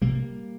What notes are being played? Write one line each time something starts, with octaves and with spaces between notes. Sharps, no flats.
C2 C3 G3 A#3